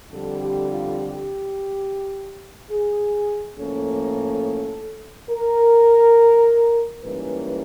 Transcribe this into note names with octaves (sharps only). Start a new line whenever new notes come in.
F2 D3 G3 A4
G4
F4
G4
G#4
A2 F3 A#3 C#4 A4
A#4
G#2 E3 G3 A#3 C#4 B4